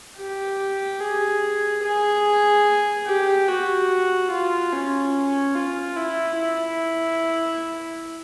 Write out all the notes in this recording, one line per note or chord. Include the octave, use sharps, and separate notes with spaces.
G4
G#4
G#4
G4
F#4
F4
C#4
F4
E4
E4